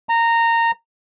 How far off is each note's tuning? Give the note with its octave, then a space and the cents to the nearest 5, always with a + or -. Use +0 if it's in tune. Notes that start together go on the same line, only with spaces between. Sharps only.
A#5 -15